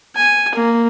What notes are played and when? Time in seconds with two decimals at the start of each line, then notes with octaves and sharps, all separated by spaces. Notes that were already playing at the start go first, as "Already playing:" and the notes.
0.15 G#5
0.55 A#3